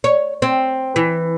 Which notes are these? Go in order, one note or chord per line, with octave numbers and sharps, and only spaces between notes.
C#5
C4
E3